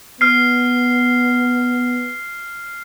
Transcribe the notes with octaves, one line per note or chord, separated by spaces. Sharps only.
B3 F6 C7